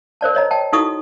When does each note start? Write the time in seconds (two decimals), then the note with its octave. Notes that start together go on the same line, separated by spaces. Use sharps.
0.21 A#4 C5 D5 A5
0.35 C#5 D#5 A#5
0.51 G5 A5
0.73 D#4 E4 F#4 A4 C#6 D#6